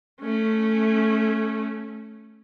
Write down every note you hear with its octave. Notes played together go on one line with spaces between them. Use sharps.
A3 C#4